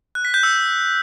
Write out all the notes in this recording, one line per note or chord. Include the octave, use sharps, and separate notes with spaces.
F#6
B6
G6
E6